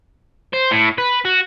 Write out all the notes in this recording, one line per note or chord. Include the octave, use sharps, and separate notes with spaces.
C5
A2
B4
F#4